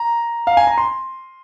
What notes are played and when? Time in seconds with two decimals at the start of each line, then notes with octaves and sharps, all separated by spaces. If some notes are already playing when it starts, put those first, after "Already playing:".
Already playing: A#5
0.47 F5
0.57 G#5
0.67 A#5
0.78 C6